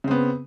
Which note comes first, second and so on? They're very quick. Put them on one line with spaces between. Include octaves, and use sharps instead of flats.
C#3 C4 B3